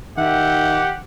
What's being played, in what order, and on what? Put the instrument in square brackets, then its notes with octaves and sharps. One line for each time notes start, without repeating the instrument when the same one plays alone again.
[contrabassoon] D#3 [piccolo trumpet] G4 [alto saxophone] E5 [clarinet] F#5